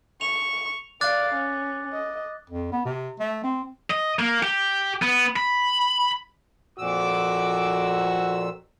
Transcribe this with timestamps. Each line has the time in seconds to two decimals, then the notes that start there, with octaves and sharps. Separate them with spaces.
0.21 C#6 F7
1.01 D5 F5 D6 F#6 A6
1.34 C#4
1.92 D#5
2.50 F2
2.72 B3
2.85 C3
3.19 A3
3.44 C4
3.90 D#5
4.19 A#3
4.43 G4
5.02 B3
5.36 B5
6.78 F2 A#2 F#4 D6 E6